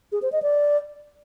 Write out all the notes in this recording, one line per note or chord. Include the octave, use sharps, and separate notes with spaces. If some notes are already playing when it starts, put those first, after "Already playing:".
G#4
C5
D#5
D5